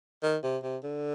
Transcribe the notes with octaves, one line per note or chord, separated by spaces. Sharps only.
D#3
C3
C3
D3